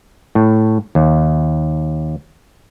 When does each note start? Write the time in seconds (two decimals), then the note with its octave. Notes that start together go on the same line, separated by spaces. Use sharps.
0.35 A2
0.95 D#2